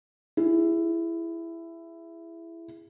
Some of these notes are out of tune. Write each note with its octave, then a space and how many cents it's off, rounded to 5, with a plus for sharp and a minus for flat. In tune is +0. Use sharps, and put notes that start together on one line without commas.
E4 +15 G#4 -10